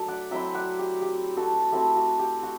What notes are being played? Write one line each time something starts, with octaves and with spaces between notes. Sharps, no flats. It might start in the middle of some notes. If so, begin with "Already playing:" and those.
Already playing: F#3 A3 D4 E5
D5 F#5
F#3 C4 E4 E5 G5
D5 F#5
G4
G4
F#4 A4
A3 C4 E4 G4
F#4
G4
F#4